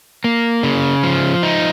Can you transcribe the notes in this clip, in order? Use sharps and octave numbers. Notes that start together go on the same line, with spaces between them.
A#3
C#3
F3
D#4